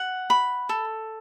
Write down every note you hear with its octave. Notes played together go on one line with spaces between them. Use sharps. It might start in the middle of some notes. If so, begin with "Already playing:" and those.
Already playing: F#5
B5
A4